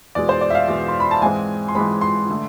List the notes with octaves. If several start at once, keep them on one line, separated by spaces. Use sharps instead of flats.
E2 B2 G#3 D5
C5
D5
E5
F5
E2 B2 G#3
C6
B5
A5
G#2 E3 G#3 C4 G#5
C6
G#2 E3 G#3 C4 B5
C6
D3 A3